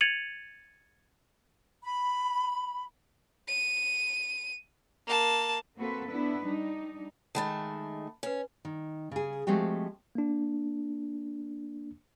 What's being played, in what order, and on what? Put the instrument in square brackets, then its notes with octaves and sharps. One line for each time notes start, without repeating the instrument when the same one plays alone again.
[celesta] G#6 A6 C#7 D#7 F7 F#7
[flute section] B5
[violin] D#7
A#3 A5
[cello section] A#3 C4 F#4 A4 B4
B3 D4 E4 B4
G3 D4 D#4
[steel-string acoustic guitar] D#3 G#3 A3 [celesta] A5 B5 A6
[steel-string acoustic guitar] C#4 [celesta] B4 G#5
[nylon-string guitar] D#3
C#3 G#4
F3 G#3 A3 C4 F#4 G4
[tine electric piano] A#3 D4